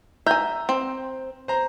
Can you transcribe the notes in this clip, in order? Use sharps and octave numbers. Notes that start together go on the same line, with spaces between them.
E5 G#5 A#5 G6
C4
C5 A#5